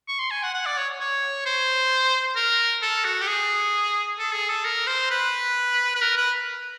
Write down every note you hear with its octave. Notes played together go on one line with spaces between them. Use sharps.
C#6
C6
G#5
F#5
F#5
D5
C#5
C#5
C5
A#4
A4
F#4
G4
G#4
A4
G#4
A4
A#4
C5
B4
B4
A#4
B4